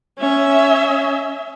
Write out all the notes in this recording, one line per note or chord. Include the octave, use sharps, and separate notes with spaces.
C#4 E5